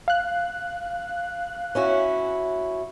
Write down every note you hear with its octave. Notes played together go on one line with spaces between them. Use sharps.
F5 F#6
C#4 E4 F#4